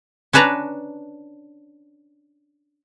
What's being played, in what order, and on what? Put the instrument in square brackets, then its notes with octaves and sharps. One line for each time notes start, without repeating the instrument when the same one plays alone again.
[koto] C#4 D4 B4 A5 A#5